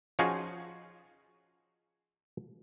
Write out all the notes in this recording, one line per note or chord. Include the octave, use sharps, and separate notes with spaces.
F3 C#4 D#4 F4 F#4 G#4